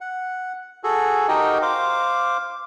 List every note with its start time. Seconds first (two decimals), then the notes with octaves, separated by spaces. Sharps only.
0.01 F#5
0.84 F#4 G#4 A4
1.28 D#4 F#4 G4 A#4 D#5 G5
1.62 C5 F5 D6